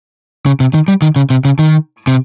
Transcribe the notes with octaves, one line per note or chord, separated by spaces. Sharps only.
C#3
C3
D#3
G3
D#3
C#3
C3
C#3
D#3
C3